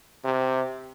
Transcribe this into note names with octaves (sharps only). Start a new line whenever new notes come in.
C3